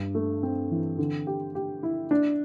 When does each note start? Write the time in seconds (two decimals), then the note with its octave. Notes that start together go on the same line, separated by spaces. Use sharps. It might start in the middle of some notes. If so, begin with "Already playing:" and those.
Already playing: G2
0.15 A3
0.43 C4
0.71 E3
0.98 D3
1.27 G4
1.55 G4
1.83 E4
2.11 D4